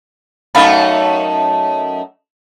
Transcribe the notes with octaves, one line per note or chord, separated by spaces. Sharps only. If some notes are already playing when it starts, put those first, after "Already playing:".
F#2 A3 D#4 F5 A5 B5